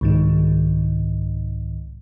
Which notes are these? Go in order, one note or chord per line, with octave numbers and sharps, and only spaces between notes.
C2 G#2 D#3